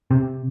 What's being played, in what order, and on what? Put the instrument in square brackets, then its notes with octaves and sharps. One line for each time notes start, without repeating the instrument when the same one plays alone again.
[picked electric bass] C3